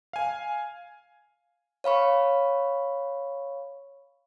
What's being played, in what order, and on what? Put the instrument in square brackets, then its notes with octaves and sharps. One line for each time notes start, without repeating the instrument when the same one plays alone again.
[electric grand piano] F5 G#5
[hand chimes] C#5 F5 B5 C#6